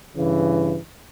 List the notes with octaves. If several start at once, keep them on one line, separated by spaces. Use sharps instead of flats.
G2 C#3 E3